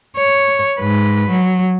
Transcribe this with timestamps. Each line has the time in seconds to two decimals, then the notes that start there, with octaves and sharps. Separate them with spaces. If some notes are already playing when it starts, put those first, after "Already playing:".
0.17 C#5
0.80 G#2 B4
1.29 F#3